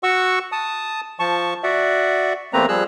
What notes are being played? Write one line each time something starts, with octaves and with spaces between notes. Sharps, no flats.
F#4 F#5 C#6 E6
A5 D#6
F3 A5 C#6
F#4 D5 E5 F#5
E2 A3 A#3 C4 B4 A#5
F3 G3 G#4 E6 F#6